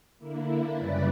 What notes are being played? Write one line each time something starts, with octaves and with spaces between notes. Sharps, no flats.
D3 A#3 E4
F#2 C#3 G3 C#4 E4 B4 D5